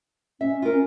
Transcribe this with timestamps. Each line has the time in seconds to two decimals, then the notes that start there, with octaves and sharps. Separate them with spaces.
0.41 C#4 E5
0.62 F4 A#4